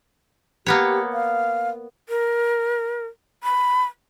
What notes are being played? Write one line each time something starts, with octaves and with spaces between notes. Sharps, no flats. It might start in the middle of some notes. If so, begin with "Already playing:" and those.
A#3 B3 G4 C#5
F5
A#4
B5